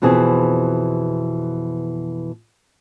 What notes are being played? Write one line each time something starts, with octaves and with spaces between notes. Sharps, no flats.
F2 B2 E3 C4 G#4